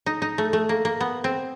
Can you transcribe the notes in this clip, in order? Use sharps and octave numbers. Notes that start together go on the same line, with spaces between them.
D#4
D#4
A3
A3
A#3
A#3
B3
C4